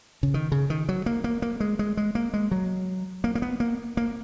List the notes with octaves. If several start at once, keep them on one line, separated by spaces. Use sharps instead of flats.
C#3
D#3
C#3
D#3
F#3
A#3
A#3
A#3
G#3
G#3
G#3
A#3
G#3
F#3
A#3
A#3
B3
A#3
A#3